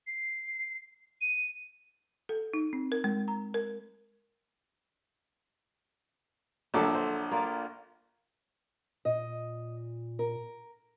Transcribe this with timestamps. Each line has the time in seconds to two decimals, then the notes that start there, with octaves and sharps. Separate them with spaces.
0.07 C7
1.21 D#7
2.29 A4
2.54 D#4
2.73 C4
2.92 A#4
3.04 G#3
3.28 A#5
3.54 A#4
6.74 A#1 D3 F#3 A4 E5 D6
6.94 C5
7.31 A#3 F4 D5
9.05 A#2 D#5
10.19 A#4